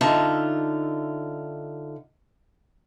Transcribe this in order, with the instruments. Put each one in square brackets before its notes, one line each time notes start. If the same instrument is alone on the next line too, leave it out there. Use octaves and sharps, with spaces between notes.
[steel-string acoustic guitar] D3 D#4 F4 E5 A5